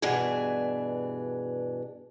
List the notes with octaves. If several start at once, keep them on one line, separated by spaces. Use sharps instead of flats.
G2 B2 E3 D4 G#4